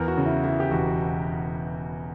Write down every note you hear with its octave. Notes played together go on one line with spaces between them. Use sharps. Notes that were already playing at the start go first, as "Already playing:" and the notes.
Already playing: E2 A#4
F#4
C#3
E4
E3 E4
G4
E1 F#4